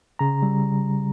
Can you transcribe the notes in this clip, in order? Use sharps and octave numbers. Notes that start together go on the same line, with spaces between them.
C#3 A#5
G3